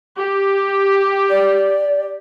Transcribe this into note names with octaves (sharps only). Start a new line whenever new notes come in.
G4
D5